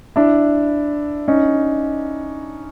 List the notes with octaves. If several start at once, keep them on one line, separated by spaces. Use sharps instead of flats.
D4 E4
C#4 D#4